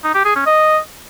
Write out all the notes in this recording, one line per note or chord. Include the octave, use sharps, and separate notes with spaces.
D#4
G4
G#4
C#4
D#5